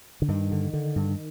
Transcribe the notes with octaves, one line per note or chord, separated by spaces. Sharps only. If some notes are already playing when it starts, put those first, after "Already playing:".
D3
G2 D#3
D3
D3
G2